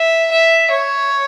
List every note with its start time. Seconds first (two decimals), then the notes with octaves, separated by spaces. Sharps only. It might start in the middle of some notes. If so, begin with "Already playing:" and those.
Already playing: E5
0.32 E5
0.70 C#5